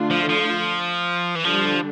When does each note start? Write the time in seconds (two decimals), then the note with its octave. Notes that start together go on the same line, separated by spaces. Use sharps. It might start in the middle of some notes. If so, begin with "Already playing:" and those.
Already playing: D3 A3 D4 F4
0.10 F3
0.29 F3
1.36 E3
1.45 D3 F3 G3 D4